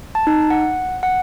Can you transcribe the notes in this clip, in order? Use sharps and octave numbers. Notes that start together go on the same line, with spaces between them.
A5
D#4
F#5
F#5